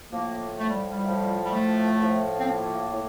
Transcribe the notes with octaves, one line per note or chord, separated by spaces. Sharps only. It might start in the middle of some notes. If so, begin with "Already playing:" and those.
A2 F3 A#3
A3
G3
G3
A2 F3
G3
A3
A2 F3
C4
A#3
A2